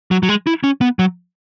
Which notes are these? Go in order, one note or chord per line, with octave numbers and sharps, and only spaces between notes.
F#3
F#3
G#3
E4
C#4
B3
F#3